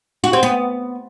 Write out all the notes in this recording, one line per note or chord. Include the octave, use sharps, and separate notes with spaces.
F#4
C4
B3